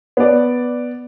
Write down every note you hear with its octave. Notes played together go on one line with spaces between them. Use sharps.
B3 D5